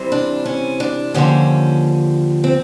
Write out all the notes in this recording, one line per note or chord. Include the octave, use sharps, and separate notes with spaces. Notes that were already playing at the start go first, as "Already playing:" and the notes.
Already playing: C3 E3 G3 C4
D4
C#4
D4
D#2 D3 F3 A#3 C#4
C4